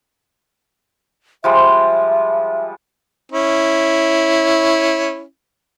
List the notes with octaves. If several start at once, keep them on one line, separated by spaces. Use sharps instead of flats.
F3 G3 G#3 E5
C#4 E4